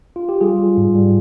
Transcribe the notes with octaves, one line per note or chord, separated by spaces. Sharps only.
F4
G4
G3 F4 G#4
G3
G#2
G3